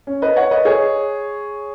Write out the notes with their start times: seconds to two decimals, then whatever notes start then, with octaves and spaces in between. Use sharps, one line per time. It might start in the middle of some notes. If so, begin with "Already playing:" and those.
0.07 C#4
0.22 B4 D#5
0.36 C#5 F#5
0.51 B4 D#5
0.65 G#4 C#5